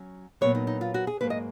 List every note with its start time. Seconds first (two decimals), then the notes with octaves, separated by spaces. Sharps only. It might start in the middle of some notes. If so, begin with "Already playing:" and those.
Already playing: F#3 C#4
0.41 A#2 F#3 B3 C#5
0.55 D#4
0.67 D#4
0.81 F4
0.94 F#4
1.07 G#4
1.21 G#2 F#3 A#3 B4
1.30 D#5